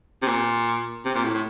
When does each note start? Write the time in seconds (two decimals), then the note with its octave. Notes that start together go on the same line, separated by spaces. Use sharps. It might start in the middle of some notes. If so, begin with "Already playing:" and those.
0.22 C3
0.28 A#2
1.05 C3
1.15 A#2
1.23 A2
1.34 A2